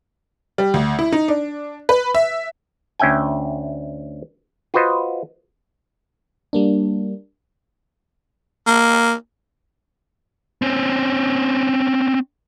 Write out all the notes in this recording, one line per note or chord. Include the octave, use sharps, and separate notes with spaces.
G3
D2
E4
D#4
D4
B4
E5
D2 C#4 E5 G5 G#5
F4 F#4 B4 C5 D#5
G3 A#3 D4
A#3
C4 C#4